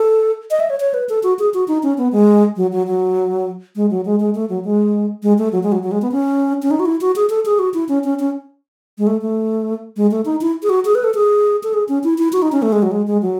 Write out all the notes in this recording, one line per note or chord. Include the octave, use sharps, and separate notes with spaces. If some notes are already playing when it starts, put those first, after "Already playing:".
Already playing: A4
D#5
E5
C#5
C#5
B4
A4
F#4
G#4
F#4
D#4
C#4
B3
G#3
F#3
F#3
F#3
G#3
F#3
G#3
G#3
A3
F#3
G#3
G#3
A3
F#3
G#3
F#3
F#3
G#3
B3
C#4
C#4
D#4
F#4
E4
F#4
G#4
A4
G#4
F#4
E4
C#4
C#4
C#4
G#3
A3
A3
G#3
A3
D#4
E4
G#4
F#4
G#4
B4
A4
G#4
A4
G#4
C#4
E4
E4
F#4
D#4
C#4
A3
G#3
F#3
G#3
G#3
F#3